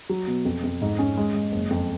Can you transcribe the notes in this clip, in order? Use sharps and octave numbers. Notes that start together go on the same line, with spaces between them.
F#3
B2
F2
F2
G#2
C#4
G#3
G#3
F#1
F2